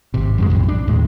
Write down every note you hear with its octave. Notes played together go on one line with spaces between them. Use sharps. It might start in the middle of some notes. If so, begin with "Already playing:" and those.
G#1 C3
F#2 D3 G#3
B1 F2 A2
D4
D#2 A2 D#3 G#3